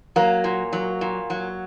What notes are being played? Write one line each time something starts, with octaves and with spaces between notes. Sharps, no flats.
F#3 A#3
A#2
F#3
A#2
F#3